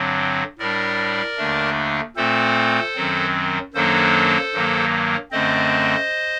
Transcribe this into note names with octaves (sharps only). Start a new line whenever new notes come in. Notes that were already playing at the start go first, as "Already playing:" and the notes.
Already playing: G2 D3 F#3 C4
A2 G3 D4 A#4 D5
D#2 D3 A3 D4
A#2 A3 C4 A4 C5
F#2 D#3 F#3 C4
F#2 D#3 F#3 A#3 D4 A4 C5
G2 D#3 F#3 A#3
F#2 D3 A3 C4 C5 D#5